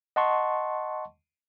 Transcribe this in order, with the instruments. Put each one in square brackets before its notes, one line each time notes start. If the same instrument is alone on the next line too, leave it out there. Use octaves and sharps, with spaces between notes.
[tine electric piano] D#5 F#5 A5 C6 C#6